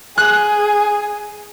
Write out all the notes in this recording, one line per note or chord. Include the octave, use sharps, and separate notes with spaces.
G#4 F#6